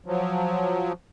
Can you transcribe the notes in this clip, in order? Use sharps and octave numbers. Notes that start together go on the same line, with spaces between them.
F3 F#3